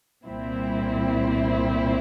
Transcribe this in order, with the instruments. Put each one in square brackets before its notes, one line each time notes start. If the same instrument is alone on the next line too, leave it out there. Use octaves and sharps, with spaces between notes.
[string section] C2 A#2 G3 C4 E4